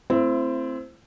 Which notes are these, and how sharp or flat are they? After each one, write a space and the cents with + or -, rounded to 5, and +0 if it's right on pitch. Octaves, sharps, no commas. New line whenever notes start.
A3 +20 C4 +0 E4 +35